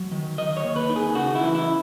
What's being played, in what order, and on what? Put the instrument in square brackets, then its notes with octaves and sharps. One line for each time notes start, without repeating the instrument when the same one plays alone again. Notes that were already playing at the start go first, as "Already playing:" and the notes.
Already playing: [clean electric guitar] F#3
D#3
D#3 D#5
C#5
D#2
B4
D#3
G#4
C#3 F#4
E4
E3
E4